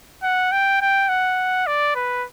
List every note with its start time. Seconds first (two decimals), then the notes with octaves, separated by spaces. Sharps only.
0.23 F#5
0.52 G5
0.81 G5
1.09 F#5
1.67 D5
1.95 B4